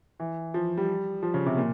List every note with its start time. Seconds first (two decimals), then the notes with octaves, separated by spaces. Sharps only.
0.20 E3
0.54 F3
0.77 G3
1.23 F3
1.34 C#3
1.46 C3
1.57 A#2